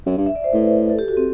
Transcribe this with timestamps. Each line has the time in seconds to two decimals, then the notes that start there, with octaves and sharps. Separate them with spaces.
0.06 F#2
0.17 G2
0.26 E5
0.36 D5
0.44 C5
0.53 A2 B4
0.90 A4
0.99 G4
1.08 F#4
1.17 C4